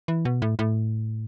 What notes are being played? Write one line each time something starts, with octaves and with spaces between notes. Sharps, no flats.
E3
B2
A2
A2